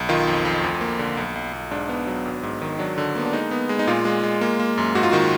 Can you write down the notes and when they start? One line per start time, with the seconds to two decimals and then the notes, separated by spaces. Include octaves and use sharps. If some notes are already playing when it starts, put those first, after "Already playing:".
Already playing: B1
0.09 D#3 F4
0.27 F2
0.45 F2
0.63 D2
0.81 A#3
0.99 D3
1.17 B1
1.35 B1
1.53 B1
1.71 G#2 D4
1.89 B3
2.07 F#3
2.25 G#1
2.43 G#2
2.62 D#3
2.79 F#3 D4
2.98 D3
3.15 A#3 B3
3.26 D4
3.33 G#3 D#4
3.51 B3
3.69 G#3
3.79 D#4
3.87 A#2 F4
4.05 G#3
4.23 G#3
4.41 A#3
4.59 A#3
4.78 F#2
4.95 G#2 F#4
5.03 F4
5.11 D#3 F#4